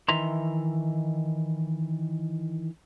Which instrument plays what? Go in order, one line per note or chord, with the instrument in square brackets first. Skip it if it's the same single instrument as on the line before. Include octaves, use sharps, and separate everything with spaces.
[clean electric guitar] D#3 E3 E5 A#5 C6